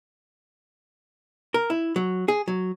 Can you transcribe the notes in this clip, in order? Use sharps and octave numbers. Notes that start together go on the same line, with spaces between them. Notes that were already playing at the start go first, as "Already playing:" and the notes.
A#4
E4
F#3
G#4
F#3